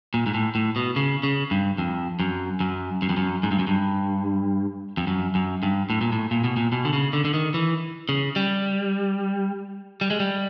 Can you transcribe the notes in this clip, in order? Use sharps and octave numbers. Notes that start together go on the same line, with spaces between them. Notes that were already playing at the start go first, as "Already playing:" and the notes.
A#2
G#2
A2
A2
B2
C#3
C#3
G2
F2
F#2
F#2
F#2
F2
F#2
G#2
G2
F#2
G2
F2
F#2
F#2
G2
A2
A#2
A2
A#2
B2
A#2
B2
D3
C#3
D3
D3
D#3
E3
C#3
G3
G3
G#3
G3